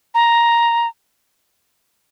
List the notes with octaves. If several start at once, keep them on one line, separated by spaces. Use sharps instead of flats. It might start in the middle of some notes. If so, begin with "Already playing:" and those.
A#5